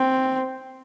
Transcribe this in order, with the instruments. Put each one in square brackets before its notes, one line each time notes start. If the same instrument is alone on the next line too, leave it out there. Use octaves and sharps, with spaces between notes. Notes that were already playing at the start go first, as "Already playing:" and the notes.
Already playing: [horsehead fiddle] C4